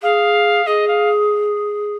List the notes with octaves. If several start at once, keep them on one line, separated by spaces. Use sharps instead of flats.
G#4 F5
G#4 D#5
F5